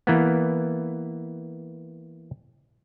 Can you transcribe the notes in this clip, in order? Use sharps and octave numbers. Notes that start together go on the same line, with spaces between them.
E3 A#3 B3